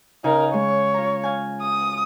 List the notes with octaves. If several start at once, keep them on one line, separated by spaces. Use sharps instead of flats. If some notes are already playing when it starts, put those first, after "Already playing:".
C#3 D#4 A#4 G#5
G#3 C#5
F4 A#5
F5 G#5
D#6